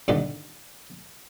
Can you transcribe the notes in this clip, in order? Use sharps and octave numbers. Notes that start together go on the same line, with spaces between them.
G2 A#2 D3 D#3